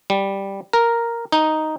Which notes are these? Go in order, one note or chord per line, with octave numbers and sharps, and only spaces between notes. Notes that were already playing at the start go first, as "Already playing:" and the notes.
G3
A#4
D#4